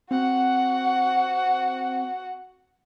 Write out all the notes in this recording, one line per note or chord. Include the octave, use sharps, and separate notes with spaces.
C4 F#4 F#5